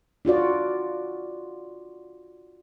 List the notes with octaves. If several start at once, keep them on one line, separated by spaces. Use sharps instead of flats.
D4 F4 F#4 D5